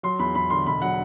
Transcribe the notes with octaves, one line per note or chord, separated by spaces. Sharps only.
F#3 C6
E2 B5
E2 B5
D3 C6
E1 B5
F#3 F#5